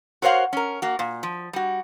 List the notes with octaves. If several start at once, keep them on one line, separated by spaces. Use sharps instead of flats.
F#4 A#4 C5 C#5 F5 F#5
C#4 A#4
A#3 F#4
A#2
F3
G3 F#4